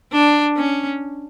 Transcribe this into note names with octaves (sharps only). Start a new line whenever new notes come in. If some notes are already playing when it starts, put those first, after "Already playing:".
D4
C#4